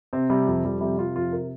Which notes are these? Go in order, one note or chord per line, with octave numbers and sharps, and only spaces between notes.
C3 C4
C3 G3
F2
F2 G3
C3 G3
C3 F4
F2 F4
C3 A#4